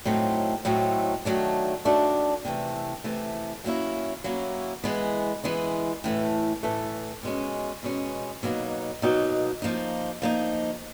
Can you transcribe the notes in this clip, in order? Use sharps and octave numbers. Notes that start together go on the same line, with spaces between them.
A2 F#3 A3 C4 D#4
A2 F#3 A3 C4 D#4
D#3 F#3 A3 D4
D#3 F#3 A3 D4
C3 E3 A3
C3 E3 A3
F#3 A#3 C#4 E4
F#3 A#3 C#4 E4
E3 G#3 B3
E3 G#3 B3
A2 E3 A3
A2 E3 A3
B2 G#3 C#4
B2 G#3 C#4
B2 F#3 A#3 D#4
B2 F#3 A#3 D#4
F3 A#3 D#4
F3 A#3 D#4